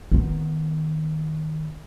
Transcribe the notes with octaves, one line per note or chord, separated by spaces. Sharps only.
D#3 B3